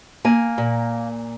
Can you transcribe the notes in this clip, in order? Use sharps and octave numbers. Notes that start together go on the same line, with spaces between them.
A#3 G#5
A#2